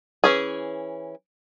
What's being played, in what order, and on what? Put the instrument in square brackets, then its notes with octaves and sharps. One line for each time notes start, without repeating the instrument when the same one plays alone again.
[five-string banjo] E3 C#4 G#4